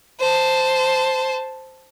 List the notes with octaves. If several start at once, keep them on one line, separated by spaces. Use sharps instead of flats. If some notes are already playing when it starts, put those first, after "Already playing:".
C5 A5